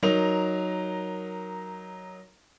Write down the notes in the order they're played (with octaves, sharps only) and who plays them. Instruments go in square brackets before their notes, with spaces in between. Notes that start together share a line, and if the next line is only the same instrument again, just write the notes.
[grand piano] F#3 D#4 A#4 A#5 F7